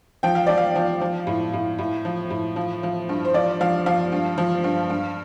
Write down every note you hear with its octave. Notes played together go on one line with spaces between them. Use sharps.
F3 G5
F5
F3 D5
F5
F3
F3
A2
A2
A2
F3
A2
F3
F3
G2
C5
F3 D5
F3 F5
F3 F5
G2
F3
G2
G2